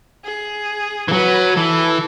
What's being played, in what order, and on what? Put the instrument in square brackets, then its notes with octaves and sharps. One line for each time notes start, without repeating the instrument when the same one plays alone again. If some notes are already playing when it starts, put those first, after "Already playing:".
[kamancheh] G#4
[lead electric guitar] E3
[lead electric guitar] F#3 [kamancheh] B4
[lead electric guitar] E3 [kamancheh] A4